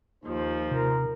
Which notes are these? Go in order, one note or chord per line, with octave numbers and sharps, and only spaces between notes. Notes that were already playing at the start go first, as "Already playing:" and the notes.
D#2 F3 D#4 F4 C5
C3 A#4